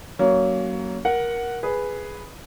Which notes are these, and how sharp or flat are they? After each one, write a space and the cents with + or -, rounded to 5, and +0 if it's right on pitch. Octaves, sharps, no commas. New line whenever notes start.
F#3 +15 A#3 +0 C#4 +15
A#4 +15 F#5 +0
G#4 +0 B4 +0